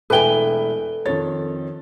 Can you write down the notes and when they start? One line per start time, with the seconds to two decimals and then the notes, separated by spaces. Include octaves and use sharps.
0.10 E1 A3 E4 A4 B4 G5 G#5 G7
1.06 F2 D#3 C#5 A6